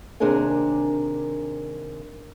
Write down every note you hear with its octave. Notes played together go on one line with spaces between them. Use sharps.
D#2 C3 D4 G#4 A#4 G#5